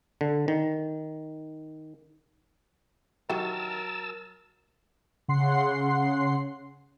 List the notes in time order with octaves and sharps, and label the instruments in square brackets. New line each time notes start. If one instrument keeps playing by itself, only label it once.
[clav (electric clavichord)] D3
D#3
[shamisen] D#3 E3 G4 [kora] F#3 [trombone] A#4 [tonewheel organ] A5 E6
[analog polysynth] C#3 F#5 C6 C7